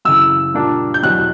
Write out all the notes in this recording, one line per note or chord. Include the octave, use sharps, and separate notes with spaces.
F#2 C#3 E3 E6
A#2 G3 A#3 D4
G6
E2 B2 F#3 F#6